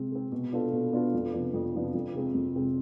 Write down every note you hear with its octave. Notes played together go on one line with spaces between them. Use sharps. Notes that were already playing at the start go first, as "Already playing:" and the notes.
Already playing: C3 G#3 C4
G#3 C4
B2
B3 D4 F4 A4
B2
B3 D4 F4 A4
F2
C3 F3 B3 D4
F2
C3 F3 B3 D4
F2
C3 G#3 C4
F2
C3 G#3 C4